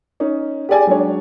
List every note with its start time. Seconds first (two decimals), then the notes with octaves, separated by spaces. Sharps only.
0.20 C#4 D#4
0.69 G4 G#4 D5 G#5
0.87 F#3 G#3 D4 C#5